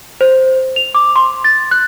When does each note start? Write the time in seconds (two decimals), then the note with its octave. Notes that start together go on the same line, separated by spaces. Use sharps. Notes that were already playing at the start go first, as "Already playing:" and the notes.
0.21 C5
0.76 F7
0.95 D6
1.16 C6
1.44 A6
1.71 F#6